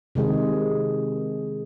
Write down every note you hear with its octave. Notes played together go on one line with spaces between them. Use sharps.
C3 D#3 G#3 G#4